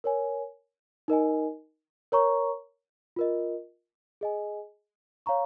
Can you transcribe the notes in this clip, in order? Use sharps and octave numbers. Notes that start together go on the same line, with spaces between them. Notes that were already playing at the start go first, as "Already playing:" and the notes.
A#4 C#5 G#5
D#4 A#4 D#5 G#5
A#4 C#5 A#5 C#6
F4 A#4 D#5
G#4 D#5 G#5
C#5 F5 A#5 C#6